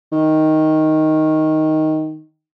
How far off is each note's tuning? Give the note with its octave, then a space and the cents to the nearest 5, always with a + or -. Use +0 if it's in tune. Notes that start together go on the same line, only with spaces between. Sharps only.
D#3 +5